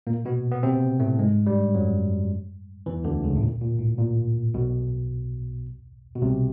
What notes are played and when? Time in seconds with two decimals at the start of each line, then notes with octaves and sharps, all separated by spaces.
0.07 A#2 A#3
0.25 B2 B3
0.51 B3
0.63 C3 C4
1.00 A2 A3
1.19 G#2 G#3
1.46 G2 G3
1.75 F#2 F#3
2.86 E2 E3
3.04 D2 D3
3.23 C#2 C#3
3.37 A2
3.42 A#2
3.61 A#2
3.79 A2
3.99 A#2
4.54 B1 B2
6.15 B2
6.22 C2 C3